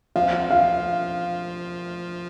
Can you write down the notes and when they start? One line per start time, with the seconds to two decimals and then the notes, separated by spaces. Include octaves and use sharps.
0.16 F3 F5
0.50 F5